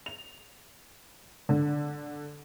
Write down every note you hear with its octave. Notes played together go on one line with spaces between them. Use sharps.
F7
D3